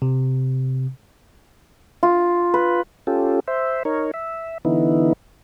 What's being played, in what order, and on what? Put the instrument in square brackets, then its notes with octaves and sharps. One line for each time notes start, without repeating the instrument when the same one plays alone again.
[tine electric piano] C3
[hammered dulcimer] F4
B4
[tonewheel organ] C#4 F4 G4 A4
C5 E5
D#4 A#4 C#5
E5
D3 E3 B3 D#4 E4